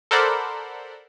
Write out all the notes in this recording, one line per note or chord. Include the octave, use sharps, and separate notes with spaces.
A4 A#4 C5 D5 F#5 B5